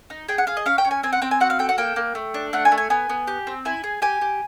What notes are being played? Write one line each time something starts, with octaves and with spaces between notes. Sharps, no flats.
D#4
G#4 G5
F#5
G#4 F5
D#5
C#4 F5
G5
C#4
G#5
C4 G#5
F#5
C4 G5
G#5
F#4 F#5
F5
A4 G5
F#5
A#3 G5
A#3
A3
D4
A3 F#5
G#5
A3
G#5
B3 G#5
B3
G4
C4
E4 G#5
G#4
G4 G#5
G4